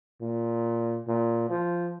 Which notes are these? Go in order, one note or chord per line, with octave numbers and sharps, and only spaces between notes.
A#2
A#2
F3